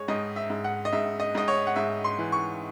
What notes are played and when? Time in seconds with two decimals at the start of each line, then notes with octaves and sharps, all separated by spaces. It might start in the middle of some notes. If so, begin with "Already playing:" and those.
Already playing: G#3 C#5
0.08 G#2 D#5
0.36 E5
0.50 G#2
0.64 F#5
0.85 D#5
0.92 G#2 E5
1.20 D#5
1.35 G#2 D#5
1.48 C#5
1.67 F#5
1.76 G#2 E5
2.04 C6
2.18 E3
2.32 C#6